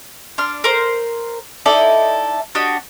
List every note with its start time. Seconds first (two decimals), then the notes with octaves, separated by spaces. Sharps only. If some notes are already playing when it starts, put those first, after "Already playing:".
0.38 D4 C6 F6
0.64 A#4 C5
1.66 D#4 E4 A4 D5
2.55 D4 F#4 G4 D#5